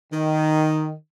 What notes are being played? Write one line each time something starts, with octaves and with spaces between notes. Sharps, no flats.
D#3